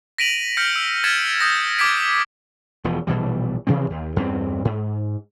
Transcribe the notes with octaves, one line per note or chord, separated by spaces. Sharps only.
A#6 B6 D7 D#7 F7 F#7
F6 G6 A#6 C#7
E6
F6 G#6 A6 B6 C#7 E7
D#6 F6 G6 A#6
D6 F6 G#6 A#6 B6 D7
E1 E2 F3
A#1 B2 E3 G3
C3 E3 F3 C4
D#2
E2 G2 A3 C4
G#2